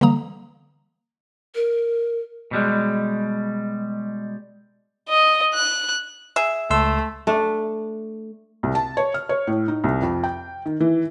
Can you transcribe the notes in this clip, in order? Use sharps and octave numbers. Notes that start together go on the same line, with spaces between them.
D3 E3 G3 A#3 A#5 D#6
A#4
B2 G3 G#3
D#5
F#6
G#4 E5
C#2 A3 C6 E6
A3 D4
C2
A5
C#5
F6
C#5
A2
D#4
C2
F2
G5
D#3
E3